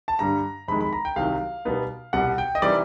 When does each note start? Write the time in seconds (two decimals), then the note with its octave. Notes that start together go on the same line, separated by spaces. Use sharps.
0.08 A5
0.19 G2 D3 G3 A#5
0.68 F2 C3 D#3 G#3 B5
0.81 B5
0.93 A#5
1.05 G5
1.16 C2 C3 D#3 F#3 F5
1.65 B2 G3 B3 D#4
2.13 C2 B2 G3 F#5
2.38 G5
2.55 D#5
2.62 C3 E3 G3 C4 D#4 D5